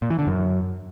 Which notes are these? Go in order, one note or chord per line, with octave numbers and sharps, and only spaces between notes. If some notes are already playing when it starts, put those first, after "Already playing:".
A#2
E3
D3
F#2